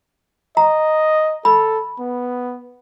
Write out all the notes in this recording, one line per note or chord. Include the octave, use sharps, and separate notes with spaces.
D#5 A#5
A4 B5
B3